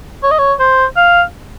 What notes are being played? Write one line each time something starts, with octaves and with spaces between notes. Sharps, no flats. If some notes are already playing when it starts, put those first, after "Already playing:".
C#5
D#5
C#5
C5
F5